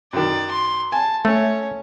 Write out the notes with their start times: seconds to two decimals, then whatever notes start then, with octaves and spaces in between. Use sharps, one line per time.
0.13 F#2 D#3 D5
0.51 C6
0.92 G#5 A5
1.25 A3 C#4